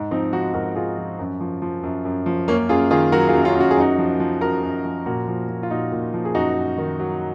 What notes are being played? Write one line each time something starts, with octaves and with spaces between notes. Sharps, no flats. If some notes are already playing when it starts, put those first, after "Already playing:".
Already playing: G#2
F3 C4 D#4
F3 D#4 F#4
G#2 F#4 A#4
G#2 F4 G#4
F3
F#2
F3
F3
F#2
F#2
F3
F#2 A#3 C#4
F#2 F4 G#4
D#3 F4 G#4
F#3 F#4 A#4
F4 G#4
F#2
C#4 F4
F#2
F#4
G#4
F#2 D#4 F#4
F3
F3
F#2 F#4 A#4
F#2
F3
A#2 F#4 A#4
F3
F3
F4
A#2 D#4 F#4
A#2
F3
G#4
F#2 D#4 F#4
F#2
D#3
F#3